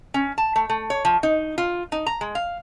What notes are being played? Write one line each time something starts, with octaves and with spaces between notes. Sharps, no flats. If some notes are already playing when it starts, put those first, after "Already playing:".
C#4
A5
A3
A3
C#5
F3
D#4
F4
D#4
A#5
G#3
F5